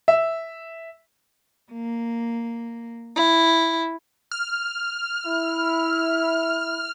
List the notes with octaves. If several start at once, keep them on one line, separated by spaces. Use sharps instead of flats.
E5
A#3
E4
F6
E4